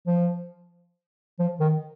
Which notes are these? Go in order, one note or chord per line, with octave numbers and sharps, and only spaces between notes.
F3
F3
D#3